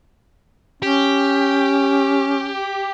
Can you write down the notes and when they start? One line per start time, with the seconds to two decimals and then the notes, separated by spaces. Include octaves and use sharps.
0.83 C#4 G4